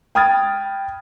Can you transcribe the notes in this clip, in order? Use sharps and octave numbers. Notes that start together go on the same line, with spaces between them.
G5 B5 D#6 F6 G#6 A6